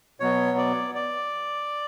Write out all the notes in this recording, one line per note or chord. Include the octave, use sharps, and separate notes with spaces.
B2 F#3 B3 C#5
D5
D5